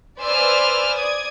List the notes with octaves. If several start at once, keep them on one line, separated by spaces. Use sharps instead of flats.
B4 C5 D5 G#5 E6 F6
D5 D#6 G#6